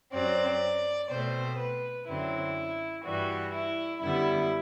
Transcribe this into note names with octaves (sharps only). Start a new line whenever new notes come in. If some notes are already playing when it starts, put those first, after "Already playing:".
F#2 F#3 C4 D5
B2 A3 C4 C5
B4
F#2 D3 F#3 C4 E4
G2 E3 G3 F#4
E4
F#2 D3 G3 B3 E4